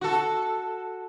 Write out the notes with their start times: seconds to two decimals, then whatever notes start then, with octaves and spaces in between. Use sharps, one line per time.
0.01 F#4 A4